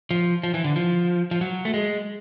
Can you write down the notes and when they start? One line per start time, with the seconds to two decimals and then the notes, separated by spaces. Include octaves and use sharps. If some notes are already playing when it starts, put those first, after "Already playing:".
0.11 F3
0.43 F3
0.54 E3
0.64 D3
0.76 F3
1.31 F3
1.41 F#3
1.65 A3
1.74 G#3